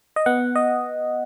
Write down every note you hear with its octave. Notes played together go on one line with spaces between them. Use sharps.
D#5
B3 F#5
D#5